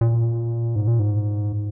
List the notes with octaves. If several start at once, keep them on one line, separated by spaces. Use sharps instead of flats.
A#2
G#2
A#2
G#2